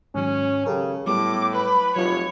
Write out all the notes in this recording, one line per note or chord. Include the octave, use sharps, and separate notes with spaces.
G#2 D#3 F#3 C#4
C#3 G4 A4 A#4
A2 F#3 G3 B3 D6
B4 B5
F1 F#3 F4 C#5